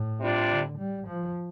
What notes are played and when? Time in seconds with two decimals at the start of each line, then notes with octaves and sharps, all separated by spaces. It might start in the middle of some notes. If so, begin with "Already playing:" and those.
Already playing: A2
0.19 C3 G3 D4 F4
0.49 D3
0.78 G3
1.07 F3